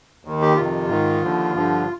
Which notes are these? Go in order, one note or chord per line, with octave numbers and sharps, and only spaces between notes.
D#2 D#3
G4
F2 C3 D#3 F4
G#2 D#3
D#2 D3 F3
G2 D3 F3